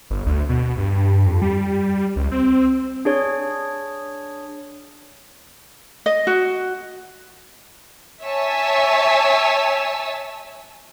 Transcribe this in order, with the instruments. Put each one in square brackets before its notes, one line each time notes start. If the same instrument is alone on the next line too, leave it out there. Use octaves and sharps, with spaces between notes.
[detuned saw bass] G1
D2
B2
G2
F2
G3
C#2
C4
[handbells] D4 G#4 C#5
[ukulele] D#5
F#4
[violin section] C#5 E5 G#5 A5 E6